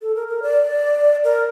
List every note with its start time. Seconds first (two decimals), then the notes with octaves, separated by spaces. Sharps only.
0.02 A4
0.15 A#4
0.28 A#4
0.42 D5
1.24 A#4